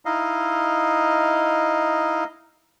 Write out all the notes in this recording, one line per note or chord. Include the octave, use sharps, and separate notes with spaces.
D#4 E4 D#5 F5